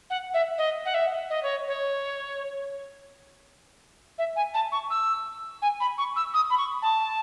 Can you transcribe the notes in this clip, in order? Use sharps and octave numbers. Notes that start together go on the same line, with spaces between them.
F#5
E5
D#5
F#5
E5
D#5
C#5
C#5
E5
G#5
A5
C#6
E6
G#5
B5
C#6
E6
D#6
B5
C#6
A5